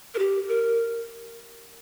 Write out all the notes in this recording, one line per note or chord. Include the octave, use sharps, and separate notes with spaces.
A#4
G4
A#4